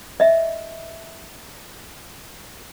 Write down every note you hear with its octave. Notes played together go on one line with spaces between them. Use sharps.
D#5 E5